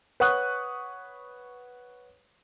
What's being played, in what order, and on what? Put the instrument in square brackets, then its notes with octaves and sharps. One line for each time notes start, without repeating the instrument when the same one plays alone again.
[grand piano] B4 C#5 F#5 C#6 D#6 F#6